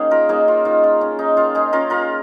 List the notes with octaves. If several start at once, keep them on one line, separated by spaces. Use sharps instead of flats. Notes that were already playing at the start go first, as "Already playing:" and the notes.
Already playing: D#3 A#3 C#4 D#4 G#4 C#5
F4 A#4
A#3 C#4 D#4 G#4
F4
D#3 F4
F4
C#4
D#4
D#3 F4
D#4 G#4
C#4 F4 A#4
F4 A#4